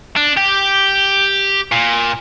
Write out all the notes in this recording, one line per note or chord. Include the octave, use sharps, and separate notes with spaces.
D4
G4
A#2